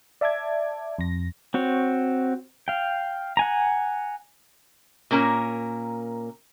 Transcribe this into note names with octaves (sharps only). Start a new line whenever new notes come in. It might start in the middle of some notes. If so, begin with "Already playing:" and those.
D5 E5 A5 D6 G#6
F2 A#6
C4 F#4 C#5
F5 G5
F#5 G#5 A#5
A#2 A#3 C#4 A#4